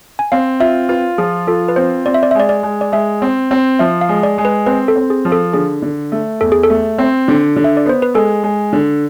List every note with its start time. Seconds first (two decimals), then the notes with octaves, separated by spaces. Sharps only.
0.19 G#5
0.32 C4 F5
0.60 F4 E5
0.89 F4 B4
1.18 F3 G#4
1.47 F4 A4
1.69 B4
1.76 C4 C5
2.06 C4 D5
2.14 E5
2.23 D5
2.31 E5
2.35 G#3 D5
2.49 D5
2.63 G#3
2.81 D5
2.92 G#3 E5
3.22 C4
3.51 C4
3.79 F3 E5
4.01 F5
4.09 G#3
4.23 D5
4.38 G#3
4.45 B4
4.66 C4 B4
4.88 A4
4.96 C4
5.10 G#4
5.25 F3
5.32 A4
5.53 D3 G#4
5.82 D3
6.12 A3
6.41 E2 A4
6.52 G#4
6.63 A4
6.70 A3
6.98 C4
7.28 D3
7.56 D3
7.64 E5
7.77 D5
7.86 B3 C5
8.02 B4
8.14 G#3 A4
8.43 G#3
8.73 D3